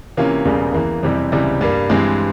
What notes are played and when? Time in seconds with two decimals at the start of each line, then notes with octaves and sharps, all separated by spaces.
0.17 C3 E3 A#3 C#4 F4
0.45 E1 E2 C#3 G3 A#3
0.74 E2 E3 A#3
1.03 F2 C3 E3 G3
1.32 C#2 C3 E3 G3
1.61 G2 G3 A#3
1.90 G2 E3 G#3 C4